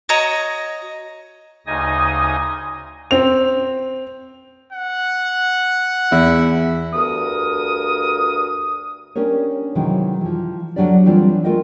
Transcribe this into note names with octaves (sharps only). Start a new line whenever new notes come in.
F#4 C#5 D#5 A#5
D2 C#3 D#4 D#5 G#5 D#6
C4 F7
F#5
E2 E4
D2 G2 A#4 D#6
C#4 D4 G4 A#4 C#5
C3 D#3 E3 F#3 G#3
E3 F3
D2 C#3 F#3 D4 G4 D5
E3 G3 A3 C4 D4 F4
G#3 A3 F4 A#4 D#5 G5